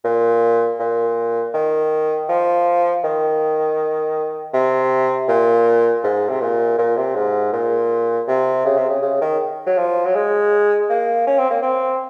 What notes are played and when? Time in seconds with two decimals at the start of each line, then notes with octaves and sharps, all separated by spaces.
0.04 A#2
0.79 A#2
1.54 D#3
2.29 F3
3.04 D#3
4.53 C3
5.28 A#2
6.04 G#2
6.29 C3
6.41 A#2
6.78 A#2
6.97 C3
7.15 G#2
7.53 A#2
8.28 C3
8.65 C#3
8.77 C3
8.89 C#3
9.02 C#3
9.21 D#3
9.66 F#3
9.77 F3
10.05 F#3
10.15 G#3
10.89 A#3
11.27 C#4
11.38 C4
11.51 A#3
11.62 C4